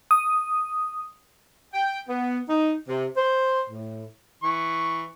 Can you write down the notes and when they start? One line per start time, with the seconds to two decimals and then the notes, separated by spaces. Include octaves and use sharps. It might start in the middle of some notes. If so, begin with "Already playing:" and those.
0.11 D#6
1.74 G5
2.09 B3
2.49 D#4
2.88 C3
3.17 C5
3.70 A2
4.43 E3 C#6